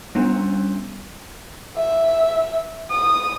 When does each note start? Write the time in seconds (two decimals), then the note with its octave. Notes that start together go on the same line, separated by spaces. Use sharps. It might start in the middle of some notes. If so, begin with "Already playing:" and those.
0.15 G3 B3 C#4 D4
1.76 E5
2.91 D#6